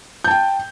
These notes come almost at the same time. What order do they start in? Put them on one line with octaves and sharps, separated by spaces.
G6 A5 G5